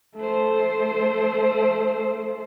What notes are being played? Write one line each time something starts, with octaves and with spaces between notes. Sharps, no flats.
A3 C5